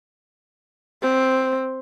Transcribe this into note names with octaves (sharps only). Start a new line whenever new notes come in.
C4